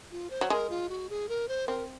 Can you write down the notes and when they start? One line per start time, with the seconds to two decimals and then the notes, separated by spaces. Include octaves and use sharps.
0.12 F4
0.30 C5
0.41 F#3
0.50 G#3 A#4
0.70 F4
0.89 F#4
1.10 G#4
1.29 A#4
1.49 C5
1.68 C4 A#4